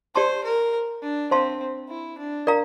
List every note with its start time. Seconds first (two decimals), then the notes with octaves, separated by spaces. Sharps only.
0.15 G4 C5 D5 A5 C6
0.44 A#4
1.03 D4
1.31 C4 C5 F5 A5 C6
1.89 E4
2.18 D4
2.47 A#4 D5 F5 A#5